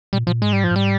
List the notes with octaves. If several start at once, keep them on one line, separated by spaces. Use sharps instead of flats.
A#2 G3
A#2 F3
G#2 G#3
G3
F3
G#2
G3